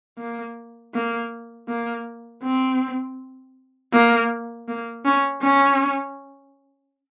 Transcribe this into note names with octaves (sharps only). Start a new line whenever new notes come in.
A#3
A#3
A#3
C4
A#3
A#3
C#4
C#4